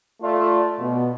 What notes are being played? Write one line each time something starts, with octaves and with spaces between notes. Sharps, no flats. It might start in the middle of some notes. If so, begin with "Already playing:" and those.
A3 F4 D5
B2